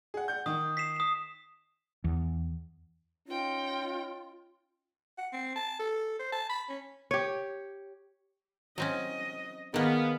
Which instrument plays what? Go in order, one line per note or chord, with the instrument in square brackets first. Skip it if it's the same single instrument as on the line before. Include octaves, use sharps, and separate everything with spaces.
[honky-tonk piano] G#4 F#5
F#5 G6
[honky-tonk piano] D#3 [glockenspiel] D#6
[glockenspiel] B6 C7 E7
D#6 E7
[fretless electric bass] E2
[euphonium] C#4 [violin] D#4 G5 [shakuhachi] F4
[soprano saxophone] F#5
C4
A5
A4
C5
A5
B5
C#4
[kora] G4 C#5
[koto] F#3 C4 C#4 [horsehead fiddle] D#5
[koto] D#3 A#3 [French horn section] B3 [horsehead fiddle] G#4 F5